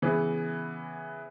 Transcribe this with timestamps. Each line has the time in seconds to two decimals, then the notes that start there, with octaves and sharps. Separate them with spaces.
0.02 C#3 E3 B3